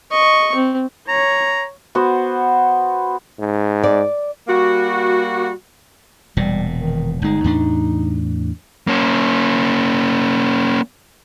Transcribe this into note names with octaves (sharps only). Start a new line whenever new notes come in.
D#5 C#6
C4
C#5 A#5
B3 F#4 C5
G#2
D5
G3 A#3 F#4
E1 A#2 G3
D#3
G1 G#3 D#4
E2 A2 D4
A#3 C#4